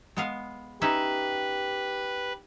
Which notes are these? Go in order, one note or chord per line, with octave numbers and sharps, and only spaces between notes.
G#3 B3 F5
C#4 D#4 G4 B4 E5